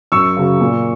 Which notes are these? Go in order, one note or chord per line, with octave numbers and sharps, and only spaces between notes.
F#2 C#6 E6
C#3 F#3
A#2